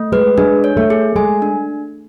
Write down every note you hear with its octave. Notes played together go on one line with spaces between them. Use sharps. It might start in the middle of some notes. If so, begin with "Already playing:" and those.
Already playing: A3
G#3 B4
G#3 D4
C#5
A3
G#4
G#3 G#5
D4